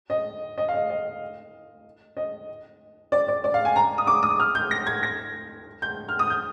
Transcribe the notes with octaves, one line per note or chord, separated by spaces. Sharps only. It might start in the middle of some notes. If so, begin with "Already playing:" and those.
D#5
D#5
F5
D#5
D#5
D#5
D5
D5
D5
F5
G#5
A#5
D#6
D6
D#6
F6
G6
A#6
G#6
A#6
G6
F6
D#6
G6